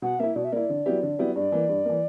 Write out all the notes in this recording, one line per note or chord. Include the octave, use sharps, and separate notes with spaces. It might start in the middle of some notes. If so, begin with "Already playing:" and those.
B2 F#5
A#3 E4 E5
B2 D5
E5
A#3 E4 D5
D3
F#3 B3 E4 G4
D3
F#3 B3 E4 G4
G2 D5
E3 A#3
G2
E3 A#3